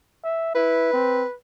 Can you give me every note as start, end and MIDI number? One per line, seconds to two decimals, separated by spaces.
0.24 0.52 76
0.55 0.93 64
0.55 1.32 71
0.93 1.25 60